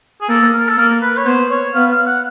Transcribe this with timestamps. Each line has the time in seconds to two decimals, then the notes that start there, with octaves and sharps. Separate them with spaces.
0.21 G#4
0.29 A#3 A4
0.53 A#4
0.68 A4
0.78 A#3 A#4
1.02 B4
1.17 C#5
1.26 B3 C5
1.50 C#5
1.75 B3 F5
1.91 F5
2.07 F#5